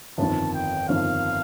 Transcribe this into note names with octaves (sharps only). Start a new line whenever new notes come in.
G1 F2 D#3 A5
G5
G1 F2 D#3 F5